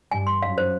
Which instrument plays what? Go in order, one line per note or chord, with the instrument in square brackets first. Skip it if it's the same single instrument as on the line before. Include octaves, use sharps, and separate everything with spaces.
[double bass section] G2 [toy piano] G#5
[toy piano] C6
[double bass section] F#2 [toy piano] F5
[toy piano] C5